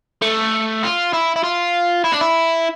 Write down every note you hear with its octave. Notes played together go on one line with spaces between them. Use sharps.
A3
F4
E4
E4
F4
E4
D4
E4